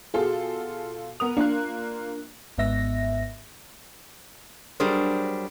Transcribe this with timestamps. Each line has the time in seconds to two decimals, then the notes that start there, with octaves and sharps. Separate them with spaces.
0.14 B2 F4 F#4 G#4 A4
1.20 B3 A#4 D#6 F7
1.37 A#3 D4 F4 A#4 F#6
2.58 G#1 G#2 B3 E5 A#6
4.80 F#3 G3 D4 G#4 A#4 C5